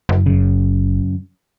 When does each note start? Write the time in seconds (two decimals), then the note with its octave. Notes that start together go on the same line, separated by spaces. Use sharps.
0.09 F#1
0.26 F#2 C#3